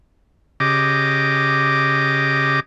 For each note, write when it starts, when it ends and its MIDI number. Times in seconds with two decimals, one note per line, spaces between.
0.60 2.60 49
0.60 2.60 67
0.60 2.60 75
0.60 2.60 86